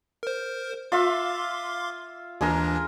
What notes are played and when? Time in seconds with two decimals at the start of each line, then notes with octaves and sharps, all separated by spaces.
0.23 A#4 C5
0.92 F4 E5 F5 C6 D6
2.41 D#2 E3 G#3 D4 G#4 A#4